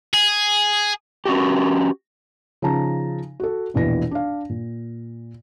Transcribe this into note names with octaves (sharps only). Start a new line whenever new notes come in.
G#4
C#4 F#4 G4
C#3 F3 D#4 A5 A#5
F#4 A4
E1 A#1 B2 E3 A#6
D4 F5
A#2